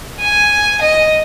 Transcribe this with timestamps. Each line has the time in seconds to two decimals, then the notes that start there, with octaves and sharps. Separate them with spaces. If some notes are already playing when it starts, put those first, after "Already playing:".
0.20 G#5
0.81 D#5